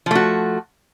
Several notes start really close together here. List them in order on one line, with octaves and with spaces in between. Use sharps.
F3 A3 F#4